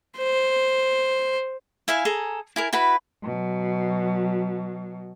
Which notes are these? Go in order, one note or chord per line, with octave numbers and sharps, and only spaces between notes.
C5
E4 E5 F5 G#5
G#4 A4 A#5
E4 G#4 A#4
E4 F#4 B4 B5
B2 F#3